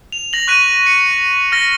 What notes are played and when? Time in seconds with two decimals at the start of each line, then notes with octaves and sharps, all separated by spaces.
0.12 F7
0.33 A#6 F#7
0.47 C#6 F#6 B6 D#7
0.86 C#7
1.52 F6 A#6